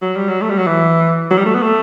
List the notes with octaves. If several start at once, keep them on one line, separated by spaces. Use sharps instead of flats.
F#3
G3
F#3
A3
G3
F#3
E3
F#3
G3
A3
B3
A3